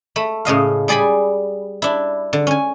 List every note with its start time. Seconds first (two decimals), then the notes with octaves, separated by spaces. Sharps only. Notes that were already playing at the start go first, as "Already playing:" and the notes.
0.16 A3 B5
0.45 A2 C#3 D#5 F5
0.88 G3 G#4 D5 G#5 B5
1.82 D4 E4
2.33 D3
2.47 C#4 G#5